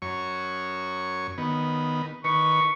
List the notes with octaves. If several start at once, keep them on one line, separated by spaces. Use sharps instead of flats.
F#2 C#5 C#6
D#3 B3
D#3 B4 C#6